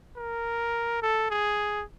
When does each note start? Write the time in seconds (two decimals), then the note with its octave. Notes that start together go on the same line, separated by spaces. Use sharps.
0.16 A#4
1.02 A4
1.30 G#4